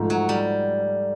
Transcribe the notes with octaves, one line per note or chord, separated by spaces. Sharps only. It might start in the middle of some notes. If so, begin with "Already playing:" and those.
Already playing: G#2 F3 A3
F#3
G3